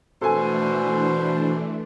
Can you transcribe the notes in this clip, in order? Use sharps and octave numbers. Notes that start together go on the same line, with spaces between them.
B2 E3 A3 D4 A4 C5 G#5